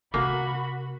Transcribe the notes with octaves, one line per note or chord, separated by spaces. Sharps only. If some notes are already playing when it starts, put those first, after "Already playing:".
C3 A#3 F#4 B5